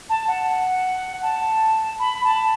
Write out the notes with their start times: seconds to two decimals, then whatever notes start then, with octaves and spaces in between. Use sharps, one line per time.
0.10 A5
0.28 F#5
1.23 A5
1.99 B5
2.24 A5